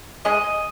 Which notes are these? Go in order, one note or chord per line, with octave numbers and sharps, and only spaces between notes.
G#3 D#5